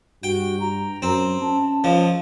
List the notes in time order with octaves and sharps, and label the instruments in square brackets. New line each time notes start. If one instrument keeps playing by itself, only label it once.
[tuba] G2 [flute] F#4 [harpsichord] G5
[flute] A#5
[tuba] F#2 [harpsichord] C4
[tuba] C#4 [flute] A5
[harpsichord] C#2 F3